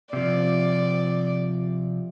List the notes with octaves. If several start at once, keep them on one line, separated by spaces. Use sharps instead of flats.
C3 F3 D5